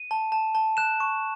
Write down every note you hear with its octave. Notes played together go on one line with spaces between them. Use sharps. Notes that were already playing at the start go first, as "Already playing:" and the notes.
Already playing: D#7
A5
A5
A5
F#6 E7
C#6